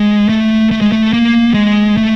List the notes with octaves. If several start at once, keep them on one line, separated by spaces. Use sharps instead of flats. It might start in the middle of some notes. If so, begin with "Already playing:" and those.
Already playing: G#3
A3
A3
G#3
A3
A#3
G#3
A3